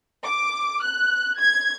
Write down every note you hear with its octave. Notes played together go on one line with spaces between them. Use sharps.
D6
F#6
G#6